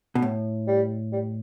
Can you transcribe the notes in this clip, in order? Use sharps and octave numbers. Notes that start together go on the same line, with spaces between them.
B2
A2
G3
G3